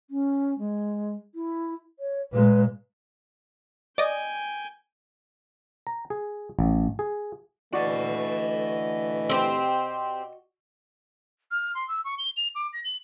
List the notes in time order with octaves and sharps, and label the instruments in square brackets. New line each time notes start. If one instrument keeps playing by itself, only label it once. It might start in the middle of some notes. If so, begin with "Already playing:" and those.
[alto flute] C#4
G#3
E4
C#5
[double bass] A#2 G#3 [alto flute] B4
[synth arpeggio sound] D5 D#5 [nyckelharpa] G5 G#5
[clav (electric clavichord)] A#5
G#4
A1
G#4
[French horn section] D3 E3 A3 [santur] F#4 D5 C#6 [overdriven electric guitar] D#5 F#5
[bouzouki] C4 G4
[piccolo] F6
C6
E6
C#6
G7
F7
D6
A#6
F#7